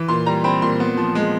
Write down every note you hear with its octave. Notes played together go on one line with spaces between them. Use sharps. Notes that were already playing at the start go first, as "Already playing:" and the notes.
Already playing: E3
A#2 C6
G3 A#5
C4 B5
A#2 C6
B3
F3
G#3